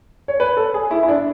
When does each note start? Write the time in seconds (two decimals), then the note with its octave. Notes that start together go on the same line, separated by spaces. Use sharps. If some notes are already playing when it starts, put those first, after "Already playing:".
0.28 C#5
0.40 B4
0.57 A4
0.74 G#4
0.91 E4
1.03 E4
1.08 D4